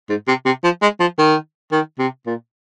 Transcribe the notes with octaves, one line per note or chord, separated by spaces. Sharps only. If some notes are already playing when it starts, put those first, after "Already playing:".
G#2
C3
C3
F3
G#3
F3
D#3
D#3
C3
A#2